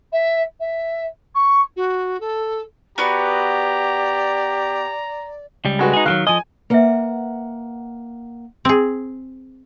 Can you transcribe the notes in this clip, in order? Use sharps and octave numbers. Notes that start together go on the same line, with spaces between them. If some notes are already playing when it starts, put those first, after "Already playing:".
E5
E5
C#6
F#4
A4
B3 F#4 G4 B4 D5 A#5
C#2 G3
G#3 F#4 B4
D#4 G#4
D#3 E3 F#3 F5 F#6
F3 D#5 G#5
A#3 B4 E5 F#5
C4 G#4